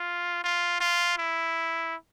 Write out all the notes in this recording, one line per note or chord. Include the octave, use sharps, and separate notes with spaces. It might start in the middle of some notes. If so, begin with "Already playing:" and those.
Already playing: F4
F4
F4
E4